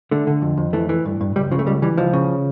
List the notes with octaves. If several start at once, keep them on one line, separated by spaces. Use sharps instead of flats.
D3 A3
D3
F2
F2
E3 A3
E3
G2
G2
C#2 G3
C#3 F3
A3
C#2 G3
E3 G3
C#2 F3
C#3